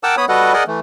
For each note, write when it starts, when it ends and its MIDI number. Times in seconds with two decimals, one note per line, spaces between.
0.03 0.15 70
0.03 0.15 78
0.03 0.15 79
0.03 0.15 81
0.03 0.15 86
0.03 0.15 88
0.17 0.25 59
0.17 0.25 73
0.17 0.25 83
0.17 0.25 87
0.29 0.53 55
0.29 0.53 66
0.29 0.53 69
0.29 0.53 71
0.29 0.53 75
0.29 0.53 78
0.54 0.64 68
0.54 0.64 70
0.54 0.64 74
0.54 0.64 75
0.54 0.64 78
0.54 0.64 80
0.67 0.80 52
0.67 0.80 57